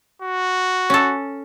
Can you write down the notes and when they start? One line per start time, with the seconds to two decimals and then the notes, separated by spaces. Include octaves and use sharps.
0.23 F#4
0.90 C#4 A4